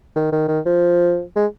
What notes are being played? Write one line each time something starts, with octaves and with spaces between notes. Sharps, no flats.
D#3
D#3
D#3
F3
G#3